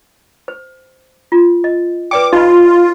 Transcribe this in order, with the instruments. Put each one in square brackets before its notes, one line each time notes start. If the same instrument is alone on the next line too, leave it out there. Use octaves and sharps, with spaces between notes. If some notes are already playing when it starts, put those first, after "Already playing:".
[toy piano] C5
F4
D#5
[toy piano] B4 D5 G5 [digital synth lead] D6
[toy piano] D#4 D#5 B5 [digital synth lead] F4